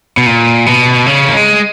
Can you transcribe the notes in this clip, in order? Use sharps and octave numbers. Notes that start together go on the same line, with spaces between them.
B2
A#2
B2
C#3
A#3
G#3